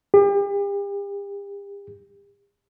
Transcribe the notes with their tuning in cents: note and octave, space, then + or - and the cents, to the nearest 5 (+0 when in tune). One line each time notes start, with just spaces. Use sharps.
G4 +40